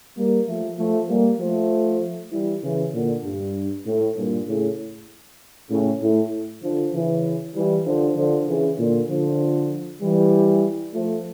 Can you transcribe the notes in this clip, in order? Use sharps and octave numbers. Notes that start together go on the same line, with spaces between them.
G3 A#3
F3 A3
F3 A3
G3 A#3
F3 A3
E3 G3
C#3 E3
A#2 D3
G2
A2
G2 A#2
A2 C#3
A2 C#3
A2
D3 F3
C#3 E3
E3 G3
D3 F3
D3 F3
C#3 E3
A#2 D3
D3 F3
E3 G3
F3 A3